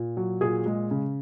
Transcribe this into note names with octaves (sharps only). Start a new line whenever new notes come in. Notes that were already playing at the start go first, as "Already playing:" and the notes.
Already playing: A#2
F#3
A#2 G#4
G#3
C#3